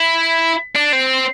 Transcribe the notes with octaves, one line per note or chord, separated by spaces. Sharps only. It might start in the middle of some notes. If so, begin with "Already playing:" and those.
Already playing: E4
D4
C4